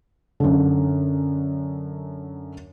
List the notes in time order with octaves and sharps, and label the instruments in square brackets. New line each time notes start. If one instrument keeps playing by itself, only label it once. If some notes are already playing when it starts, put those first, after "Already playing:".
[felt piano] F#2 D3